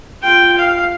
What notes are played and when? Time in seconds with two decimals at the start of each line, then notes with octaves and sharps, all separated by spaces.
0.22 F4 G5
0.58 F5